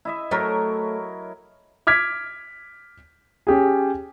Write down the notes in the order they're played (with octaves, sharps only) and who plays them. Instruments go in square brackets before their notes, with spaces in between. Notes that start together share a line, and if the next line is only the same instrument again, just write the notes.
[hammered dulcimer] E4 D#5 E5
[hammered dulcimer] F#3 A#4 C#5 [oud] A3 C5 E5
[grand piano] D6 F6 G#6 B6
C#4 G4 G#4